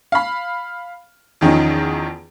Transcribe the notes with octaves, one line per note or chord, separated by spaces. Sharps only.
F5 B5
E2 D#3 F3 C#4 D#4